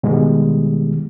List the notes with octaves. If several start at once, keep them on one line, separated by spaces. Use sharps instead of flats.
B2 D#3 G3 G#3